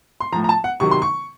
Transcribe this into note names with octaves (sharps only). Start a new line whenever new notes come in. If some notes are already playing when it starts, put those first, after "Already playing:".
C6
A2 F3 A#5
A#5
A5
F#5
C3 D#3 F#3 C#6
C6
C#6